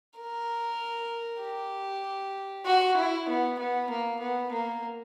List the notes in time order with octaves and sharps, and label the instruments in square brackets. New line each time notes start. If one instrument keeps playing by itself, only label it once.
[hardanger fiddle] A#4
G4
F#4
E4
B3
B3
A#3
B3
A#3